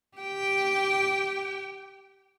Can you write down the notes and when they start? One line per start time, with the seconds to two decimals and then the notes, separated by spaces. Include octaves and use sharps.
0.17 G4 G5